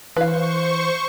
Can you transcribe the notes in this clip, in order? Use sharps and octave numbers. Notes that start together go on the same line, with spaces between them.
E3 B4 C5 F5 C#6